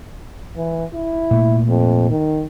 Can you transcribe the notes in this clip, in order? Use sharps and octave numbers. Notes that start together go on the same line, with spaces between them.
E3
E4
A#2 A3
F2
D#3